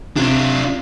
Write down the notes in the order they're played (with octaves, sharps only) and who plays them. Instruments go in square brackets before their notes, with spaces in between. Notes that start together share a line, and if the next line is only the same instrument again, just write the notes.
[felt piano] C3 [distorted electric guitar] D4 F4